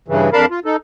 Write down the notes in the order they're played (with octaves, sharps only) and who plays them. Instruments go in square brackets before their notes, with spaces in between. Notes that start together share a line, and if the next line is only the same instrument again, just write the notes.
[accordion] G2 C#3 E3
F2 D4 A#4 F5 A5 B5
F4
D#4 A4